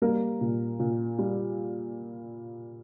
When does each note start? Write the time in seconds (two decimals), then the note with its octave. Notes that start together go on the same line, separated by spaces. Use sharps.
0.02 G3 A#3 A#4
0.41 A#2
0.79 A#2
1.19 G3